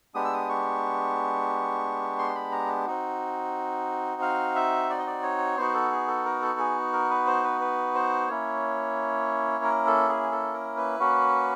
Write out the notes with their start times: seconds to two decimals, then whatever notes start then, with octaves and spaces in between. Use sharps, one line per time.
0.15 G#3 B3 D4 G4 D#6
0.24 E6
0.33 D#6
0.49 C#6
2.18 C6
2.35 B5
2.52 A#5
2.86 C4 D#4 F#4
4.22 F5
4.55 E5
4.90 D5
4.99 D#5
5.07 D5
5.23 C#5
5.57 B3 D#4 F#4 C5
5.74 A4
5.91 G#4
6.08 A4
6.25 A#4
6.42 A4
6.59 G#4
6.93 A#4
7.10 B4
7.27 C5
7.44 B4
7.61 B4
7.95 C5
8.28 A#3 C#4 E4 C#5
9.64 A#4
9.87 A4
10.09 G#4
10.32 A4
10.54 A#4
10.77 B4
11.00 A#3 C#4 F#4